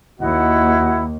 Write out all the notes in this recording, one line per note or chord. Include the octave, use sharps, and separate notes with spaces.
D#2 E4 F#4 D#5 F#5